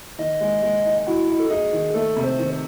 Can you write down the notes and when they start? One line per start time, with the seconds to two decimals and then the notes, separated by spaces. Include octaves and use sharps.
0.19 D#3 D#5
0.41 G#3
0.62 G#3
0.85 D#4
1.07 E4 F#4
1.29 D#4
1.40 A4
1.50 D#4 G#4
1.73 D#3
1.94 A3 A4
2.16 C3
2.24 C5
2.39 D#3